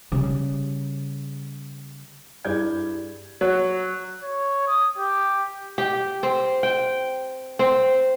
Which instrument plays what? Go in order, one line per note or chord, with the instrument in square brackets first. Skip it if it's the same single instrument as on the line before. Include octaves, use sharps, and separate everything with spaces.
[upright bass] C#3 G3
[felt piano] G2 E4 G#4 D5 G6 G#6
[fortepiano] F#3
[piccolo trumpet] C#5
D#6
G4
[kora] G4
C4
G5
C4